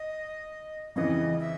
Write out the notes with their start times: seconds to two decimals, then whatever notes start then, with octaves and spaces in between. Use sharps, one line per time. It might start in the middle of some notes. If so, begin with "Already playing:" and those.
Already playing: D#5
0.95 F2 C#3 E3 D#5
1.40 E5